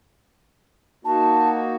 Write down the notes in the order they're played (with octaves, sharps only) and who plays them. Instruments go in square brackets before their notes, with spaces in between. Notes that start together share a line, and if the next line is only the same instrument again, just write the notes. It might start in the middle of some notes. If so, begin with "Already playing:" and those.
[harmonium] A#3 D#4 F#4 [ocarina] A5